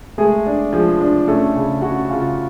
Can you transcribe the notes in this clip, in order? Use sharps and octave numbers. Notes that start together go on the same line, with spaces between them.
G#3 A3 G#4
D4
F3 G#3 G#4
D4
A3 C#4 A4
C#3
C#4 F#4
C#3 F4